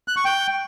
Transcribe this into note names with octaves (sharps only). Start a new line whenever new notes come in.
F#6
C#6
G5